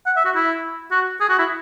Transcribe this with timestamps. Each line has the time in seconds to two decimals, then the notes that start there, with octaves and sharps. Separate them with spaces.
0.06 F#5
0.17 E5
0.25 F#4
0.35 E4
0.91 F#4
1.21 G#4
1.29 F#4
1.39 E4